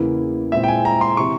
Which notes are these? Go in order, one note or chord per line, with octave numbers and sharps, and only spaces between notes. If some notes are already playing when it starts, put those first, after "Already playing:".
Already playing: E2 C#3 E3 A#3 E4
A#2 G#3 C4 E4 E5
G5
G#5
A#5
C6
C3 E3 C#6